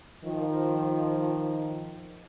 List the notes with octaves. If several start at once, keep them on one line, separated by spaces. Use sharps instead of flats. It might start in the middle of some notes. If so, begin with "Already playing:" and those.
D#3 F3